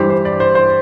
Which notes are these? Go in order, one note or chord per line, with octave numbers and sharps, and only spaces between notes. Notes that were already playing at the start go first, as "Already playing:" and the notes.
Already playing: G2 E3 G3 G4 C5
C5
D5
C5
C5